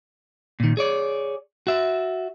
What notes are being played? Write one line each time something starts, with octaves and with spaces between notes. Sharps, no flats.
A#2 D#3
G#4 C#5 D5
F#4 E5